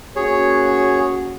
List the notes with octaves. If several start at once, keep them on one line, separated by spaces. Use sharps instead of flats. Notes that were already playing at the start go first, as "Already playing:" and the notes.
A#3 C#4 F#4 G#4 C#5